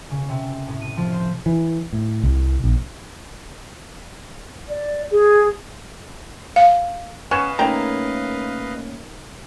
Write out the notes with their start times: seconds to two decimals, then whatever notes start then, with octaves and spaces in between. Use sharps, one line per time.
0.11 C#3
0.29 C3
0.67 A2
0.81 D#7
0.97 F3
1.12 C5
1.46 E3
1.93 A2
2.23 C2
2.64 A#1
4.68 D5
5.12 G#4
6.56 F5
7.31 B3 C#4 B4 D#5 F5 C#6 G#6 E7
7.59 A3 A#3 C#4 D#4 A#4 G5 A#5